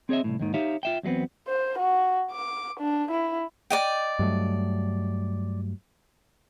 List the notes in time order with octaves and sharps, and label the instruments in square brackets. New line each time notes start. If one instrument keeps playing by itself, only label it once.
[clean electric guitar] C4 G#4 C#5 D#5 E5
C2 F#2 A2
D#2 G#2 D#3
D#4 G4 C#5 E5 F5
F4 E5 G5
E2 F#3 G#3 B3 C4
[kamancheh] C5
F#4
D6
D4
E4
[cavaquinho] D5 D#5 G5
[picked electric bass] G2 F#3 A3